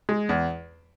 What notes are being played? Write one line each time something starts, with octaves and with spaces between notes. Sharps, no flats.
G#3
E2